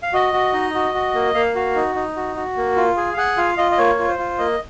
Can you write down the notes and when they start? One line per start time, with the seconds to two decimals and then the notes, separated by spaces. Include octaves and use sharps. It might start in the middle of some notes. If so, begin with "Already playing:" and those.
0.03 F5
0.13 F#4 D#5
0.33 F#4
0.53 D#4
0.75 F#4
0.94 F#4
1.15 A#3
1.34 A#3 F5
1.55 F#4 F5
1.76 D#4
1.95 D#4
2.17 F#4
2.36 F#4
2.57 A#3
2.76 F4
2.97 G#4
3.13 F5
3.17 G#4 F#5
3.37 F4 F5
3.57 F4 D#5
3.71 D#5
3.78 A#3 C#5
3.99 F4
4.08 C5
4.19 F4
4.39 A#3 D#5